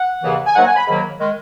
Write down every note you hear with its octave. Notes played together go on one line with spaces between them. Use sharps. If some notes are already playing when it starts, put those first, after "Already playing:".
Already playing: F#5
D#2 C#3 E3
G#5
G#2 D#3 F#3 A#3 F#5
G#5
B5
G#2 D#3 F#3 A#3
D#3 G#3